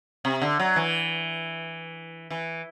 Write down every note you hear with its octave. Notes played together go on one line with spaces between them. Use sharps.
C3
D3
F#3
E3
E3